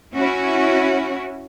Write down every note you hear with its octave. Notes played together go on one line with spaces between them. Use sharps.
C#4 E4 F#4